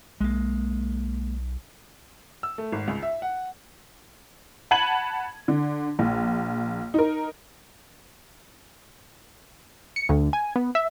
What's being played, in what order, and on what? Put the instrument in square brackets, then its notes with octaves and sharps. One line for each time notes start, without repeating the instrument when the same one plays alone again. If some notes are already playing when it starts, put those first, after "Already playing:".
[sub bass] B1 [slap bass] G#3 A#3
[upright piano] E6
A3
G#1
C#2
E5
F#5
[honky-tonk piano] F#5 A5 B5 G#6 D#7 F#7
D3
A#1
D#4 A#4
[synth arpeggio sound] C#7
D2
G#5
B3
E5